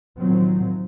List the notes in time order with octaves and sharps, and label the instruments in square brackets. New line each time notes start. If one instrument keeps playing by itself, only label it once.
[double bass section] A2 D#3 F3 F#3 C4